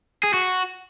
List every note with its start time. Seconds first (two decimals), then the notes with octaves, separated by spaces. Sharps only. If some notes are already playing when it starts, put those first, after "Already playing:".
0.23 G#4
0.34 F#4